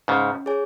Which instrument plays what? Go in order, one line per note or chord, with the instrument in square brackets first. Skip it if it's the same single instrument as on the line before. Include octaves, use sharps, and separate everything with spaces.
[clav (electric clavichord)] G#2 C#3 [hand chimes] C#4
[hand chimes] G#4 C#5 G#5